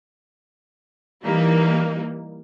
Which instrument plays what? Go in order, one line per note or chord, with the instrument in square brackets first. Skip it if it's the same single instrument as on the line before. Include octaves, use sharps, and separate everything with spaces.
[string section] E3 G3 A#3 D#4